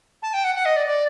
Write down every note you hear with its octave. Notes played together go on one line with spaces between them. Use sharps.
A5
G5
F#5
F#5
D#5
D5
D5